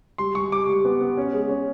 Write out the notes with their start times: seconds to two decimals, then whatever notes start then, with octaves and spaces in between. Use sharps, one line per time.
0.18 G3 C6
0.35 G3 C#6
0.51 G3 D6
0.68 G3
0.85 B3
1.01 B3
1.17 C#4
1.34 G#3
1.49 C#4